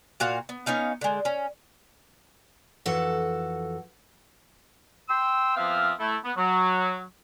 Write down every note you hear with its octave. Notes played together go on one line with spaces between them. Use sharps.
A#2 F#4 F5
B3
B3 C#4 D#4 F5
D3 G#3
C#4
F2 E3 F#4 A4 F#5
G5 C6 E6
F3 B3 C4 E5 F5
A3 E4
B3
F#3